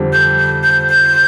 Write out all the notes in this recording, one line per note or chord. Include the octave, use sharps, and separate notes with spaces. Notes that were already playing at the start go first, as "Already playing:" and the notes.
Already playing: F2 D3 G3 C4 G4
G6
G6
G6
G6